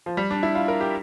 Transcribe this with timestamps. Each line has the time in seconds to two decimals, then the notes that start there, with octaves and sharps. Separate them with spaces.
0.06 F3
0.17 G3
0.31 D4
0.43 E4
0.55 F4
0.68 A#4
0.81 G4